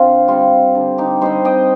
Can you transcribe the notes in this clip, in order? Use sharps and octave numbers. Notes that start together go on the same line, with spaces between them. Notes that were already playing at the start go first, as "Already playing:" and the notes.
Already playing: D3 C4 F4
G3 C4 F4
D3
D#4 G4
G3 C4 C5 D#5
D#5 G5